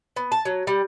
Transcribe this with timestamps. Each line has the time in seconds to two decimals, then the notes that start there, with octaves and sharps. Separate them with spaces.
0.16 B3
0.32 A5
0.45 F#3
0.67 G3